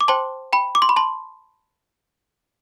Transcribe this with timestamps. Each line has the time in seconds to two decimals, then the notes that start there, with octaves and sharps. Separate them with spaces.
0.01 D6
0.08 C5 G5 A5 C6
0.53 G5 B5
0.75 D6
0.82 C6
0.89 B5
0.96 A5 C6